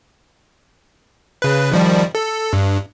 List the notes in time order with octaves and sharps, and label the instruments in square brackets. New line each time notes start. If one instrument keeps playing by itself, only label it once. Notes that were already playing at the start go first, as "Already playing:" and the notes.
[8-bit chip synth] C#3 B4
D#3 F3 G3
A4
G2